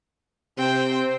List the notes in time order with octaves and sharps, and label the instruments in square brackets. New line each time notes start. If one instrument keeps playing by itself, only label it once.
[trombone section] C3 [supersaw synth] C4 C5 [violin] G5